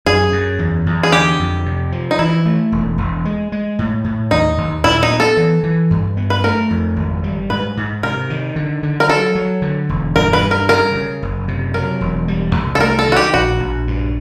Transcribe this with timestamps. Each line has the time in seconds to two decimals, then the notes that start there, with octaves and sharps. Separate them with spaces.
0.06 F#2 G#4
0.32 F#2
0.59 E2
0.86 E2
1.03 G#4
1.12 D3 G4
1.39 F2
1.66 C3
1.92 F3
2.11 D#4
2.19 E3 E4
2.46 A3
2.72 E1
2.98 E1
3.25 G#3
3.52 G#3
3.79 A2
4.04 A2
4.31 D#2 D#4
4.58 D#2
4.84 A#2 E4
5.03 D#4
5.11 B3
5.20 A4
5.37 E3
5.63 E3
5.91 G2
6.17 B3
6.30 B4
6.44 A3 A#4
6.71 F2
6.96 G#1
7.24 G3
7.50 G#2 B4
7.77 G#2
8.03 C3 A#4
8.30 D#3
8.56 D3
8.83 D3
9.00 A#4
9.09 F#3 A4
9.35 F#3
9.62 D3
9.89 E1
10.16 G2 A#4
10.33 B4
10.41 G3
10.51 A#4
10.69 C#3 A#4
10.95 C#3
11.22 F#1
11.48 C3
11.74 F#3 A#4
12.01 E1
12.28 G3
12.55 C2
12.75 A4
12.80 A3 A#4
12.99 A4
13.07 D#3 F#4
13.16 G4
13.34 A#1 F#4
13.60 A#1
13.87 G2